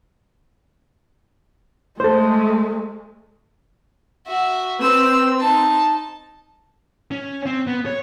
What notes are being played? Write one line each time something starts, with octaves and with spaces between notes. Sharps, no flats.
G#3 A3 A4 C5
F#4 E5
C4 B4 E6
D#4 A5
C#4
C4
B3
C#5